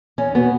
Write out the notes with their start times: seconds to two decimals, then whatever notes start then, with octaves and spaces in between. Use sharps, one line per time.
0.18 E2 C#4
0.35 B2 B3